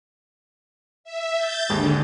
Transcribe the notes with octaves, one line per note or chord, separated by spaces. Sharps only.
E5
G6 A6
G#1 D#2 D3 G#3